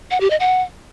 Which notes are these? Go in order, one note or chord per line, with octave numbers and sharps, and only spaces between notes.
F#5
G4
D#5
F#5